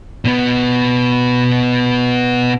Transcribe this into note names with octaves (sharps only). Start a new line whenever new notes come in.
B2 B3